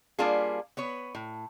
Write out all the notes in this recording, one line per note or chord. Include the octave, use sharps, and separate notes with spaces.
G3 A#3 D4 F4 G#4
B3 B4 C#5
A2